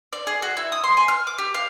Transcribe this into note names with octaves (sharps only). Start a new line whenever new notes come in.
D5
G#4
F#4
E4
D#6
C6
G#5
F6
D6
G4
F5